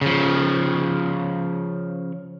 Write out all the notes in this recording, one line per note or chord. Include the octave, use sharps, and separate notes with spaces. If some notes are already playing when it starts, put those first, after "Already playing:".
C#3 F3